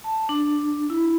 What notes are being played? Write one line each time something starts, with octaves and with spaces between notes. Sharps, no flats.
A5
D4
E4